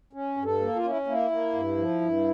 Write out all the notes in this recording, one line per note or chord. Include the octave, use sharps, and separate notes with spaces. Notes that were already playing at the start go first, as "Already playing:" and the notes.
C#4
G2
A4
A#3
F4
C#4 E4
A#3 E4
A#3
G2
F3
G2